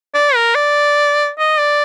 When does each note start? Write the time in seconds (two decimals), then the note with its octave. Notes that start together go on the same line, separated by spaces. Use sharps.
0.14 D5
0.35 A#4
0.55 D5
1.39 D#5
1.59 D5